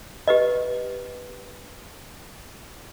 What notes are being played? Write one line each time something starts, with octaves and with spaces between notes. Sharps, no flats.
G4 B4 D#5